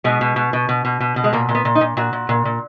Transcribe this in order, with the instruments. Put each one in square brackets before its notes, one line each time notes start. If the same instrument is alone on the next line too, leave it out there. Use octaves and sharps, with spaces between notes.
[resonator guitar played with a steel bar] B2 G#3
B2
B2
B2
B2
B2
B2
B2
G#3
A#2 A#3
A#2
B3
A#2
D#4
A#2
A#2 F#4
A#2
A#2
A#2